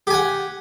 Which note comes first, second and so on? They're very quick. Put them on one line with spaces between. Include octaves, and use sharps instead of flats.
G4 G#5 F#5